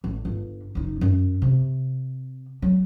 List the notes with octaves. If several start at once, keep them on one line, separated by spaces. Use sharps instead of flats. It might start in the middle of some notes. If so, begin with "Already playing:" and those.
A1
G1
F#1 D#4
F#2
C3
F#3